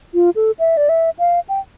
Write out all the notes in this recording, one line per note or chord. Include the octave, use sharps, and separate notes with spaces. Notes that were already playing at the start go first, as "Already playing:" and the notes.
F4
A4
E5
D5
E5
F5
G5